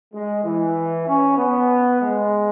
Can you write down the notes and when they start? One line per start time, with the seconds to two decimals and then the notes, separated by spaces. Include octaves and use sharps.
0.14 G#3
0.44 E3
1.07 C#4
1.38 B3
2.00 G#3